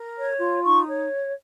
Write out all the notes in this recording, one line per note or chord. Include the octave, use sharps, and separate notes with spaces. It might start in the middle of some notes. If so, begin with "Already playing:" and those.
Already playing: A#4
C#5
F4
D#4 C#6
C#5